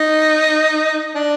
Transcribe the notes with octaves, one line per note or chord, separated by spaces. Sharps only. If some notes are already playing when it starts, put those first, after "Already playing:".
Already playing: D#4
D4